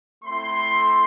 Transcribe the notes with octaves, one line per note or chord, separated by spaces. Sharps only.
A3 C4 E4 C6